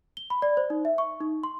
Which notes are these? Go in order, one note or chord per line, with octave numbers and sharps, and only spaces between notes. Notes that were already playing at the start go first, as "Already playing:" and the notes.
G7
B5
D5
C5
D#4
E5
C#6
D#4
C6